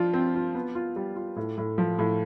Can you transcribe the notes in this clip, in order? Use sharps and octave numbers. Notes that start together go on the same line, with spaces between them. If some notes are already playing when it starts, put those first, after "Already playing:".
Already playing: F3 D4 F4
C4
F4
B3
F4
G3
F4
A2
A2
F3
A2